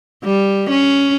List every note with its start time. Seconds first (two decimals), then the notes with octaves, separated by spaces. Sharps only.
0.24 G3
0.70 C#4